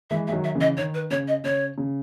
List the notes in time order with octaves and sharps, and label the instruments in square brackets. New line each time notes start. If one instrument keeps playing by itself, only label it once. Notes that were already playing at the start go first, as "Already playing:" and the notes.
[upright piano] E3 G#3 [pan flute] E5
[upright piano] G#3 [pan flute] E5
[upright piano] D#3 F#3
[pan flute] E5
[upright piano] C#3 E3
[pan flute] D#5
[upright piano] D#3 [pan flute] C#5
[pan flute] B4
[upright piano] C#3 [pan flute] C#5
[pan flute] D#5
[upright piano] C#3 [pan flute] C#5
[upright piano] C#3